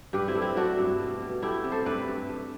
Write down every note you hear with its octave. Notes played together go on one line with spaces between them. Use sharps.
G2 G4 B4
C4 E4
A3
C4 E4
A3 D4 F#4
G2
B2
B2
A3 E4 G4
C3
A4 C5
G2 B4 D5
G2
A3